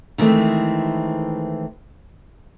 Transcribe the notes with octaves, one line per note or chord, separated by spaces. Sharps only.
D#3 E3 G#3 A3 C4